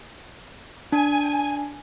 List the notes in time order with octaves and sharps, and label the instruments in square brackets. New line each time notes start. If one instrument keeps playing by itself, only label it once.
[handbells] D4 [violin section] G#5